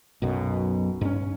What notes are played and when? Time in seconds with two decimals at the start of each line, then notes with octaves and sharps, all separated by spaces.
0.22 B1 F#2 B2
1.01 G2 C#4